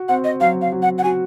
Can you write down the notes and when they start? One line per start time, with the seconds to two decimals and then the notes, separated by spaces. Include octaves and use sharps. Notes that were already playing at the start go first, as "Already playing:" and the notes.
Already playing: F#4
0.08 C4 F#5
0.24 D#5
0.40 F#3 F5
0.61 F5
0.72 F#3
0.82 F#5
0.98 F#5
1.03 F#4 G#5